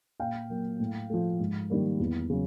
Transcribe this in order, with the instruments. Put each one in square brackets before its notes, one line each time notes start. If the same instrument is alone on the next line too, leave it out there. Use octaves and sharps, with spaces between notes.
[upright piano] A#2 F5 G5
F#3 A#3
A2
F3 A3
G#2
D#3 G3 A#3
E2
C#3 F#3